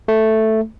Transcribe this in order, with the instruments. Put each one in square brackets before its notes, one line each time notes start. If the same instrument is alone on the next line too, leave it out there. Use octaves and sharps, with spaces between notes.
[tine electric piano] A3